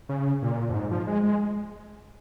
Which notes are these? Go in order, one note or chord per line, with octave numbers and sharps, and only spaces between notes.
C#3
A#2
F2
G#2
F3
G#3
G#3